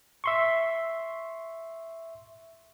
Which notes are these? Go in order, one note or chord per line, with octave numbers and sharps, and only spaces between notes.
E5 C6 C#6